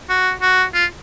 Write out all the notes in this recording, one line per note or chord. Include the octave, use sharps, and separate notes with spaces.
F#4
F#4
F4